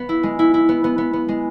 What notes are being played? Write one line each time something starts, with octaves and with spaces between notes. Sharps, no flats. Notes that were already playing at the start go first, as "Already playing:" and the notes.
Already playing: B3
E4
G#3
E4
E4
B3
B3
B3
B3
G#3